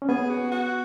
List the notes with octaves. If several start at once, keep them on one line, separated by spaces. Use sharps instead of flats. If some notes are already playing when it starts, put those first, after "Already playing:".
C#4
B3 G#4
F#4
F#4